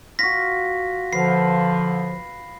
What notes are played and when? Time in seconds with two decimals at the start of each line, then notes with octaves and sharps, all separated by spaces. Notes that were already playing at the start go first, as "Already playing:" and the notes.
0.19 F4 F#4 A#6 B6
1.13 D3 F3 B4 F5 C7